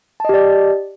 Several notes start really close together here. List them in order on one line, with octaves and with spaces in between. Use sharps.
A5 D#5 G4 D5